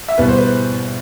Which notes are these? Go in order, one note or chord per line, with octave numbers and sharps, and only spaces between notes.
E5
E2 B2 G3 B4
C5
B4